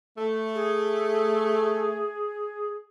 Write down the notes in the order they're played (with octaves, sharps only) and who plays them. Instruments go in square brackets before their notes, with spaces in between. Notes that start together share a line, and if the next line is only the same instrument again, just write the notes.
[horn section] A3
[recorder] G#4